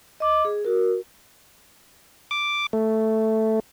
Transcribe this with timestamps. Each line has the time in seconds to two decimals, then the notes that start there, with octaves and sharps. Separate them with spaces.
0.20 D#5 D6
0.45 G#4
0.65 F#4 A#4
2.31 D6
2.73 A3